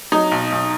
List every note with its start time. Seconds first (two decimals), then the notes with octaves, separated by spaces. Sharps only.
0.12 F#3 D#4
0.32 B1
0.52 B1